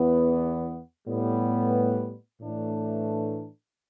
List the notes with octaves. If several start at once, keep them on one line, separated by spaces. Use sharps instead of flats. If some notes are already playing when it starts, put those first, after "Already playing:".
Already playing: E2 E3 B3
A2 G3 B3
A2 E3 A3 D4